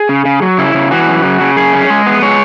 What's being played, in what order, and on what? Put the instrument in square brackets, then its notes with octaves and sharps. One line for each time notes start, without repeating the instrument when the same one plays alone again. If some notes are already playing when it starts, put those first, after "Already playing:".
Already playing: [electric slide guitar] G#4
C#3
C#3
F#3
C#3 E4
C#3
E3 F#4
F#2
C#3
C#3
F#2 G#4
C#4
G#3
B3
G#3 C#5